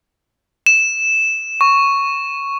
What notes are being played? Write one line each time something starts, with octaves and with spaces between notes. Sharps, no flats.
E7
C#6